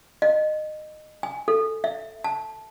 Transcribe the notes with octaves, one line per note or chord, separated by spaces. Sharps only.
D#5
G#5
A4
E5
A5